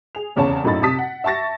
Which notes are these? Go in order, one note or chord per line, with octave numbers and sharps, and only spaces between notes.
G#4 F7
F1 E2 C#3 C#5 A5
A#1 F#2 A2 D#4 B5 A6
C3 A5 D#6 B6
F#5
E5 A5 C#6 A6 A#6